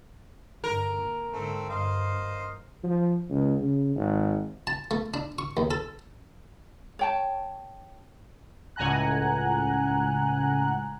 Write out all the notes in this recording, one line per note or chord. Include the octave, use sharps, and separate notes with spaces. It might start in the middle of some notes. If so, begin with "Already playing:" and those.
G2 D3 A#4
A#2
G#2 D3 A3 C4
G2 C5 D#5 F5
F3
C#2
C#3
G#1
A5
A3
D4
C#6
D#2
A4
C#5 G5 A5
C#2 A2 F#5 G#5 A#5 F#6